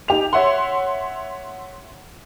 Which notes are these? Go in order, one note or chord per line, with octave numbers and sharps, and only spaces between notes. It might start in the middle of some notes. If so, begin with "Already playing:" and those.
D#4 G4 F7
C#5 E5 F#5 C6